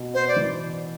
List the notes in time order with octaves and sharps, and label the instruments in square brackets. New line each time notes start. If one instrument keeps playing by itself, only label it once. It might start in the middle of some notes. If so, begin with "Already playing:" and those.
Already playing: [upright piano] B2
[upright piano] B3 [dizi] C5
[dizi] D5
[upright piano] E3